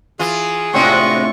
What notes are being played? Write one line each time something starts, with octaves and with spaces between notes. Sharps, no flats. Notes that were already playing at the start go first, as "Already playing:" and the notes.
E3 F4 G#4
A2 C3 G#3 B3 C4 D4 F4 C#6